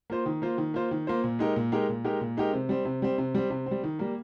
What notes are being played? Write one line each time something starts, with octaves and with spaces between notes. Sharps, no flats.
A#3 F4 C5
D#3
A#3 F4 C5
D#3
A#3 F4 C5
D#3
A#3 F4 C5
A#2
G#3 D#4 G4 A#4
A#2
G#3 D#4 G4 A#4
A#2
G#3 D#4 G4 A#4
A#2
G#3 D#4 G4 A#4
C3
G3 C4
C3
G3 C4
C3
G3 C4
C3
G3 C4
D#3
G3 A#3